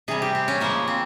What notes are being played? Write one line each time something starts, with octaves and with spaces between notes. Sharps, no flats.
C3 G3 G#4
G4
C4
C#4
C#3 F3 G#3 A#3
C4